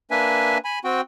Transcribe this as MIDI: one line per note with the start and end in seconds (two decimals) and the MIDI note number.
0.11 0.58 58
0.11 0.58 62
0.11 0.58 71
0.11 0.58 76
0.11 0.58 80
0.65 0.79 80
0.65 0.79 83
0.84 1.01 60
0.84 1.01 66
0.84 1.01 79